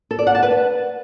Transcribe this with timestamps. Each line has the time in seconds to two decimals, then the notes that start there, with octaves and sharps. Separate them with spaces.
0.11 A4
0.19 D5
0.27 F#5
0.35 A5
0.43 B4